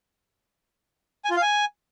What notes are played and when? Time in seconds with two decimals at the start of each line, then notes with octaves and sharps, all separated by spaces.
1.25 G#5
1.30 F4
1.36 F5
1.42 G#5